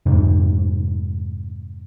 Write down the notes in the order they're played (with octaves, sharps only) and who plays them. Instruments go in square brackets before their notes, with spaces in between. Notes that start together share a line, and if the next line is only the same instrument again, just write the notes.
[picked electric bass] F2 G#2 C3